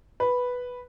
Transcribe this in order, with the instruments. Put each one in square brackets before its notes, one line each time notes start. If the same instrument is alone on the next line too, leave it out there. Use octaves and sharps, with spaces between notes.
[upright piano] B4